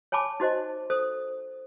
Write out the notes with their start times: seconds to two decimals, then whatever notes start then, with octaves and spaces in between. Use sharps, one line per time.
0.12 C#5 G#5 A5 B5 D6
0.40 D#4 F#4 C5 D#5
0.90 A4 C5 D#6